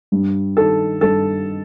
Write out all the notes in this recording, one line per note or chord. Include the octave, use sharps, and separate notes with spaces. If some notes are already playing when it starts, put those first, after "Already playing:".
G2
D#3 A4
G2 A4